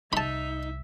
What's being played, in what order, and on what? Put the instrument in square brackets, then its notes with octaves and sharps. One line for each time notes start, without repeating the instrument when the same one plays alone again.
[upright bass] C2 [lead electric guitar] D#4 [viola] E5 [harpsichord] A5 B5